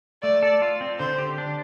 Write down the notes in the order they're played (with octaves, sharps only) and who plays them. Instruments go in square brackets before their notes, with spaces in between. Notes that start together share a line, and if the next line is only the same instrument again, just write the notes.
[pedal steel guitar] A3 [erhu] D5
[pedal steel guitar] A4
F4
C4
[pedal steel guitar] D3 [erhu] C5
[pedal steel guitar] G4
D4